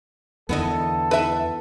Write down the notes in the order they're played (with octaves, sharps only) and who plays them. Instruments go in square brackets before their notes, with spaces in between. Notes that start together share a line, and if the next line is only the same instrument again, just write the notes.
[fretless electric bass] E2 D3 [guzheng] B3 E4 D#5 [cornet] A4
[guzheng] E4 [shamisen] B4 E5